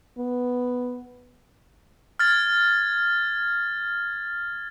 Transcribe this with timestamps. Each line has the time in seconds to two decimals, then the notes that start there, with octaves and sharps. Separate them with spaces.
0.18 B3
2.19 F6 G#6 A6